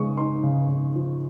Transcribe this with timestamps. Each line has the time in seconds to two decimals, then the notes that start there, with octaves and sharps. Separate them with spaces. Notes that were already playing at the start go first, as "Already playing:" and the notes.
Already playing: C#3 G#3 C#6 D#6
0.17 D#4 C6
0.43 C#3
0.69 C#3
0.95 F3